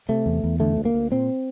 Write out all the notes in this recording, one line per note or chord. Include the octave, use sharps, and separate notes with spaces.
C3 A3
E2
E2
D3 A3
D2
A#3
D2
A#2 C4